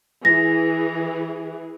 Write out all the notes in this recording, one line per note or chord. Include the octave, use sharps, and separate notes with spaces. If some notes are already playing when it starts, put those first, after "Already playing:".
E3 G#4 A#6